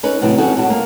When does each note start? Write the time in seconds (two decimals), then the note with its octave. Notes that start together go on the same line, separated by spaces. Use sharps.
0.03 C#4 D#4 B4
0.21 A2 C3 E3 F#3 G3 E4
0.38 G3 C#4 F#4 G#4 A4
0.57 B2 F#4 A5
0.69 A#3